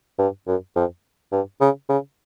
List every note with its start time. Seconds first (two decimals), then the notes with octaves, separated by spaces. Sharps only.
0.18 G2
0.47 F#2
0.76 F2
1.32 G2
1.61 C#3
1.89 C#3